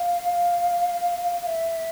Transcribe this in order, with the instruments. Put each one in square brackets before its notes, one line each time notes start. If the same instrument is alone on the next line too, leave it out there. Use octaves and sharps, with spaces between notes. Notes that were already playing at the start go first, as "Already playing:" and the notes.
Already playing: [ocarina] F5
E5